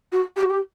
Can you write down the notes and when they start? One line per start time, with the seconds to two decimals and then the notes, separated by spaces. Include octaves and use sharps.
0.12 F#4
0.37 G4
0.43 F#4
0.50 G4